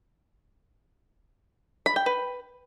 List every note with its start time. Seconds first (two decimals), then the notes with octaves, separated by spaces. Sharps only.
1.86 B5
1.96 G5
2.06 B4